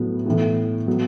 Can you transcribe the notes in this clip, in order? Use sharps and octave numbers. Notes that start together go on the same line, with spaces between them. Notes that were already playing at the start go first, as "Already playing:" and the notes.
Already playing: A2 F#3 B3
A2 E3 B3
F#3 B3